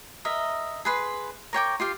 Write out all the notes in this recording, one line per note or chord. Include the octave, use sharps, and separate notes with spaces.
A#4 D#5 E5
G#4 B4 C6
A#4 C#5 G5 D6
F4 G4 F5